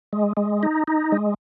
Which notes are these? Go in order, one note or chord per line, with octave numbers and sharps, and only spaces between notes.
G#3
G#3
D#4
D#4
G#3